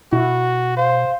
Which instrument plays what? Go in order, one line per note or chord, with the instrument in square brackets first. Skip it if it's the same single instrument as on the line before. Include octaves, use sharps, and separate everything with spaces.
[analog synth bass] B2 [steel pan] E4 [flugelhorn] F#4
[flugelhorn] C5 [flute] F5